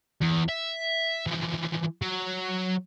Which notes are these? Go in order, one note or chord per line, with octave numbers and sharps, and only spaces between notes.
E2
E5
E3 F3
F#3